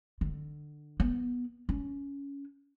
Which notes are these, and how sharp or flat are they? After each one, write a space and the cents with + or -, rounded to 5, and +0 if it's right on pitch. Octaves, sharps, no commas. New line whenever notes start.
D3 +20
B3 -15
C#4 +15